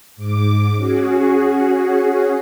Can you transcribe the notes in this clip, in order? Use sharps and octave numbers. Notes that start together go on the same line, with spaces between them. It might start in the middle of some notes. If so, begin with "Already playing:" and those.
G#2 D6
C#4 F#4 G#4